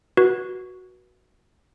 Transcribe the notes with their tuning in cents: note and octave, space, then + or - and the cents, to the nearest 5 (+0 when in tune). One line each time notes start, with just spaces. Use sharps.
F#4 +0 B4 -30